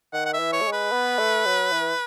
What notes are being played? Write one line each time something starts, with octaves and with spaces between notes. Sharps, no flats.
D#3 F#5
F#5
E5
E3
C#5
A3
G#3
B4
B3
A3
F#3
E3